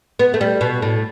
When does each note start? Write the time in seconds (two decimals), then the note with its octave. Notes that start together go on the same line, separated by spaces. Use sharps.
0.19 B3
0.34 A3
0.41 G3
0.61 B2
0.82 A2